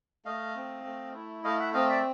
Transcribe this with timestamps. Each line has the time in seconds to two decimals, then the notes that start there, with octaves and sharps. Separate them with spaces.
0.25 A3 D#5 F5
0.55 C4
0.84 A3
1.15 E4
1.44 A3 D#5 F5
1.59 E5 F#5
1.73 C4 D#5 F5
1.89 D5 E5